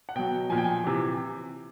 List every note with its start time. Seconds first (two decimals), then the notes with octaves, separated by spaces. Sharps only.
0.09 F#5
0.16 B2 F#3 G5
0.50 A#2 F3 G#5
0.58 G5
0.64 G#5
0.84 C3 E3